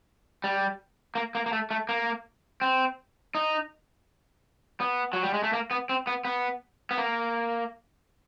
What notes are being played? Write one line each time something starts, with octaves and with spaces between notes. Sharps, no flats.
G3
A#3
A#3
A#3
A3
A3
A#3
C4
D#4
B3
F#3
G3
G#3
A3
A#3
B3
C4
B3
B3
B3
A#3